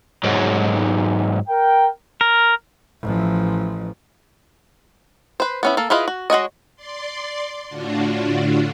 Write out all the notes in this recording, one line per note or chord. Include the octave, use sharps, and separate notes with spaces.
G#2 F#3
A#4 G5
A#4
A1 F3
B4 C5
B3 C#4 E4
A#3 A4
E4 F4 G#4 B4 D#5
F#4
G#3 F#4 C#5 D#5
D5 C6
A2 D3 D4 F4 F#4